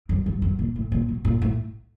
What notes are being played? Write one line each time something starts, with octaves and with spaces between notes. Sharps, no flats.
F#2
G2
F#2
A#2
A2
A#2
B2
A#2
A2